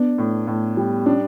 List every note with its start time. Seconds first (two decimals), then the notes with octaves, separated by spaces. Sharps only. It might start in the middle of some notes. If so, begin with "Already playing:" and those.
Already playing: B3 D4
0.18 A2
0.47 A2
0.77 G3
1.06 C#4 D4